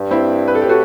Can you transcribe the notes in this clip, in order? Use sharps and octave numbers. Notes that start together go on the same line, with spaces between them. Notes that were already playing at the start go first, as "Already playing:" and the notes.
Already playing: G2
C4 E4
B4
A4
G4
A2 F#4 A4